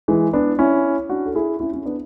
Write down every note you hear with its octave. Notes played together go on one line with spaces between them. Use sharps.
E3 G#3
B3 D4
C#4 E4
D4 F#4
A4
E4 G#4
C#4 E4
C#4 E4
B3 D4